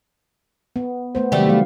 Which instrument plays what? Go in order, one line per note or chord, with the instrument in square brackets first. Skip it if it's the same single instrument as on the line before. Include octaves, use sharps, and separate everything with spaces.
[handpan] B3
A3 B3 C5
[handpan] C3 D#3 F#3 [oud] G3 A3 G4
[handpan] E3 F#3 F5